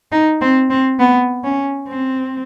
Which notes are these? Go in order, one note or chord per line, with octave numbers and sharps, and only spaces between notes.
D#4
C4
C4
B3
C#4
C4